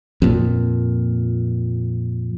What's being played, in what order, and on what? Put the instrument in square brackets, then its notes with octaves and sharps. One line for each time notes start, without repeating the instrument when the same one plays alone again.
[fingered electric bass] F2 A#2